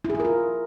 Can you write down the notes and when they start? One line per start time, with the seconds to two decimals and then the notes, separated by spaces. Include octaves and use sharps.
0.05 E4
0.10 G#4
0.15 E4
0.20 A#4
0.25 F4